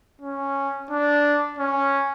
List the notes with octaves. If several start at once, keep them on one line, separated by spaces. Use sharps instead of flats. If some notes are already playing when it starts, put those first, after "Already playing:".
C#4
D4
C#4